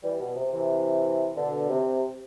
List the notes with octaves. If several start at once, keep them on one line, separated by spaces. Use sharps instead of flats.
E3 G3
B2
C3
C3 E3
B2 D3
C3